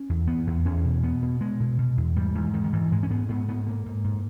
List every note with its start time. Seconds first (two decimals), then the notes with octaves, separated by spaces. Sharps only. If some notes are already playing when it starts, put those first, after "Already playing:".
Already playing: C#4
0.09 E2
0.27 E2 B3
0.47 E2
0.65 E2 C#4
0.84 B2
1.03 B2 B3
1.22 B2
1.40 B2 G#3
1.60 B2
1.78 B2
1.97 E2
2.16 G#2 G3
2.35 G#2 E3
2.53 G#2 D#3
2.64 D#3
2.73 G#2 E3
2.92 G#2 G#3
3.03 C#4
3.10 G#2 B3
3.29 G#2 B3
3.48 G#2 B3
3.66 G#2 A#3
3.86 G#2
4.04 G#2